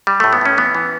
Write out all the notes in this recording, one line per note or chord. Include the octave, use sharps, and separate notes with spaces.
G3
A2 A3
B3
A2 C#4
E3 B3
E3